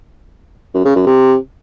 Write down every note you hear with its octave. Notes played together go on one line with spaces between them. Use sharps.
F#2
C#3
F#2
C3